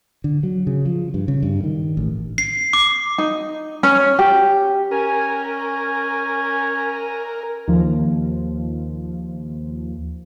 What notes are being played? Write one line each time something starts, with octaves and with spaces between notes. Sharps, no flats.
D3
F#3
C#3
F3
G2
C#3
G2
D#3
A1
C7
D6
D#4
C#4
G4
C#4 A#4 G#5
D#2 F3